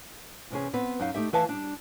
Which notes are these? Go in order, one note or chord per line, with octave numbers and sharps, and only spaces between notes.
E2 C3 C#4 G#4
B3 C4 B4
F#2 D#4 F5
A3 D#4 G4 E5
E3 E4 B4 E5 F5 A5
G3 D4